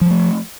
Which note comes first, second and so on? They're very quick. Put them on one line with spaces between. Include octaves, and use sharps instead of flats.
F3 F#3 A3